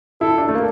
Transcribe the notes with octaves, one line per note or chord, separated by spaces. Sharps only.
E4 A4
D4
A3
A#3